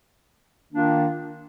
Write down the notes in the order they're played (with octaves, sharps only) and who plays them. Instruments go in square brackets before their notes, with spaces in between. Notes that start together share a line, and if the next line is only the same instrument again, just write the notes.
[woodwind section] D#3 A#3 D4 F4